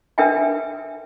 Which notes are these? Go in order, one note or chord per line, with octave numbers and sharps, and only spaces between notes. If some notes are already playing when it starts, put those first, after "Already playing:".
D4 A#4 B4 E5 G5 G#5